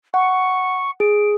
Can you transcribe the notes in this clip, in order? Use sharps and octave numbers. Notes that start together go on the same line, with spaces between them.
F#5 C#6
G#4 D7